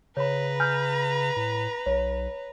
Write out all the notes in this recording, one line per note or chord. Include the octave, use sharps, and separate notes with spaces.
C#3 B4 C#5 A#5 B5
G#5 F6 G6
A2
B1 C#5